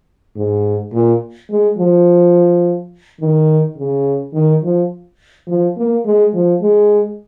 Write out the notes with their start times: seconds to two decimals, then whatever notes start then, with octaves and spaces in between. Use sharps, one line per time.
0.36 G#2
0.93 A#2
1.50 G#3
1.78 F3
3.21 D#3
3.77 C#3
4.34 D#3
4.63 F3
5.47 F3
5.77 A#3
6.05 G#3
6.34 F3
6.62 G#3